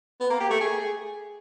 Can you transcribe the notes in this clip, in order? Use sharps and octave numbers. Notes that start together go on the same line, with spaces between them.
B3
A#3
G4
A3
G#4